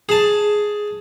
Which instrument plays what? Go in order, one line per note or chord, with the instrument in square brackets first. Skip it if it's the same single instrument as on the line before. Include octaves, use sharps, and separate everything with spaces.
[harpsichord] G#4 A5